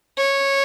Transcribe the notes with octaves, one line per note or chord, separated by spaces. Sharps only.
C#5